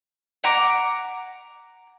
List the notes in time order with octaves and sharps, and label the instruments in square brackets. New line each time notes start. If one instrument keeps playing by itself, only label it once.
[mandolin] F#5 A#5 D6